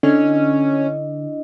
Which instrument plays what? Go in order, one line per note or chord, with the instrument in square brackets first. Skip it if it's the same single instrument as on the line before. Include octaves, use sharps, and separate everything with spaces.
[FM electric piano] D3 [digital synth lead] C#4 [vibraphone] D4 E4 D#5